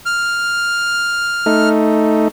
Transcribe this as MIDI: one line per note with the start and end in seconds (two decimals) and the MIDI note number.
0.06 1.69 89
1.46 2.28 57
1.46 2.28 63